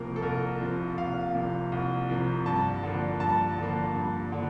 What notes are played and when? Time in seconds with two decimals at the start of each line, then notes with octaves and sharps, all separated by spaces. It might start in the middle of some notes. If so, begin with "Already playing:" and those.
Already playing: C2 C3 F3 A#3 A#4
0.16 A4
0.22 C2 A#4
0.60 C3 F3 A#3
0.98 C2 F5
1.35 C3 F3 A#3
1.72 C2
2.09 C3 F3 A#3
2.46 G2 A5
2.83 D3 F3 A#3
3.20 G2 A5
3.58 D3 F3 A#3
3.95 G2
4.32 D3 F3